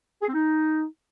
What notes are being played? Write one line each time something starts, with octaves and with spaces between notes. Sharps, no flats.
G#4
C4
D#4